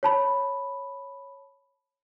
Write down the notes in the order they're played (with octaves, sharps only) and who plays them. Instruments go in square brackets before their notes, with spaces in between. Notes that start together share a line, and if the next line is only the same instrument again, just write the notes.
[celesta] C#5 A5 B5